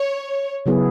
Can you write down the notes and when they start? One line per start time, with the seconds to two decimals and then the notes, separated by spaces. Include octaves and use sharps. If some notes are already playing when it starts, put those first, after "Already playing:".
Already playing: C#5
0.66 C#3 F#3 B3 E4 G#4